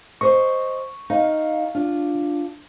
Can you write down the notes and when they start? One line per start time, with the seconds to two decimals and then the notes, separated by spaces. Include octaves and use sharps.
0.21 C5 D#5 C#6
1.10 D#4 F5
1.75 D4 F4